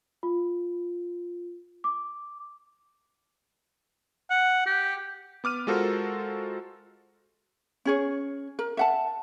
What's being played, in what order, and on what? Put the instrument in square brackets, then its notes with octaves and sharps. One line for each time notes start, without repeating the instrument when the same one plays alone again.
[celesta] F4
D6
[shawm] F#5
G4
[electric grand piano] B3 D6 F6 D#7
G#3 F4 F#4 A4 A#4 C5
[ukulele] C#4 G#4 C#5
A#4
E5 F#5 A5